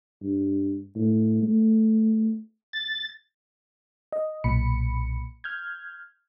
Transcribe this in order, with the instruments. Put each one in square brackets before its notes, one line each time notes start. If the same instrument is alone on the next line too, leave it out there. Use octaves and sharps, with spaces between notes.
[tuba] G2
A2
A3
[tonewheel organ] A6
[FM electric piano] D#5
B1 A#2 B5 C#7
F6 G6 G#6